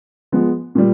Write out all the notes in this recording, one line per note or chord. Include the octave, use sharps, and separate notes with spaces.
F3 G#3 B3
A#2 G3